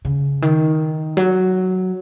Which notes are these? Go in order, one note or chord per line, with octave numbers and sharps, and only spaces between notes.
C#3
D#3
F#3